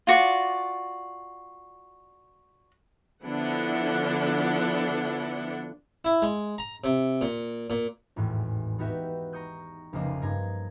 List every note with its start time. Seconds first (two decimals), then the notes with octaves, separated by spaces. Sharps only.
0.07 F4 F#4 D5
3.24 D3 F3 B3 D4 E4 F#5
6.05 E4
6.22 G#3
6.58 A#5
6.84 C3
7.21 A#2
7.70 A#2
8.16 G#1 E2 A2
8.79 B3 D#4 F#4 G4 B4 E5
9.33 A#5 C#6 D#6 G6
9.93 F1 C#2 C#3 A#3 C5 D#5
10.22 G2 A#5 G#6